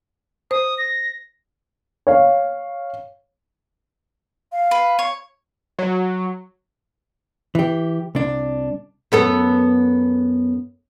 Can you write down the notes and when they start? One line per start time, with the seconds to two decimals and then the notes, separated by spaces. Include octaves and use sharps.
0.51 C5 D#6
0.78 A#6
2.07 C#5 F5
4.52 F5
4.71 B4
4.99 C#5
5.79 F#3
7.55 E3 G4
8.15 C2 D4
9.12 F#2 B3 A4